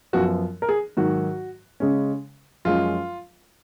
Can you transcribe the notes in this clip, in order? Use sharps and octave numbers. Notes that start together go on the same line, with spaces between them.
F#2 F3 B3 F#4
A#4
G#4
G#2 D#3 F#3 F#4
C#3 G#3 C#4
F#2 F3 G#3 C#4 F4